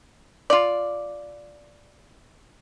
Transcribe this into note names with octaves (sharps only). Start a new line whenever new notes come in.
F4 D5